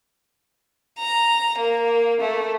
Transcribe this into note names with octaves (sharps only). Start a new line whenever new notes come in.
A#5
A#3
A3